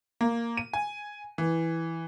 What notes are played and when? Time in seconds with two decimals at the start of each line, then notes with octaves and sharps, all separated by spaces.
0.21 A#3
0.57 D#7
0.73 G#5
1.38 E3